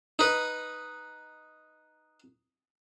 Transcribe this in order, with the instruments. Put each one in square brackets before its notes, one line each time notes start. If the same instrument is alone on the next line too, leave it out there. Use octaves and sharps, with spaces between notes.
[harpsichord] D#4 B4